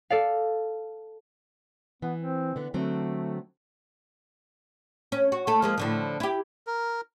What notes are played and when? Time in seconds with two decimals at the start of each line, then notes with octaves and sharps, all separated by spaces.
0.10 A4 D5 F5
2.02 E3 B3
2.18 C4
2.56 D3 B3
2.74 D3 F#3 A3 C4
5.12 C#4
5.32 F#4
5.47 A3 A4
5.62 F3 G#3 A#3
5.78 A2 D3 F3
6.20 E4 G4
6.67 A#4